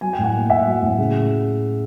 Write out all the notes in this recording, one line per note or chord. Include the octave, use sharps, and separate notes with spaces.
F#3 G#5
G5
A2
F#5 G#5
A#3
A2 E5 F#5
F#3
A2
C#3